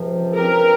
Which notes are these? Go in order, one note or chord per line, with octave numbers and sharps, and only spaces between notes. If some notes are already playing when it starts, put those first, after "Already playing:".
Already playing: C#2 C3 F3
G2 F3 C4 G4 A#4